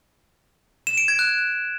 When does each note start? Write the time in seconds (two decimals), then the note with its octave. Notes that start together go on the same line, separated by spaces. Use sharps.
0.87 E7
0.98 D7
1.08 G#6
1.19 F#6